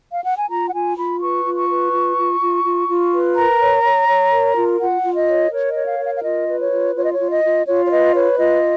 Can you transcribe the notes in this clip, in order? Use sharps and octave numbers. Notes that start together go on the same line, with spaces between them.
F5
F#5
G#5
F4 A#5
F#5
F4 G#5
F4 B5
B4 C#6
F4
C#6
B4
F4
F4
F4
F4
F4
B4
A#4 A#5
C#5
C#5
C#5
A#4
F4
F4 F#5
F4
D#5
C#5
A#4 C#5
C#5 D#5
F5
A#4
F5
F5
F4 D#5
B4
C#5
F4
F4 C#5
D#5
C#5
F4
D#5
F4
F4 C#5
C#5
B4 D#5
B4 C#5
F4 D#5